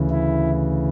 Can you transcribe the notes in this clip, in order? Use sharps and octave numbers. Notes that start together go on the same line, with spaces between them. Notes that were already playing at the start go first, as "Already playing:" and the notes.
Already playing: D2 C#3 E3
E4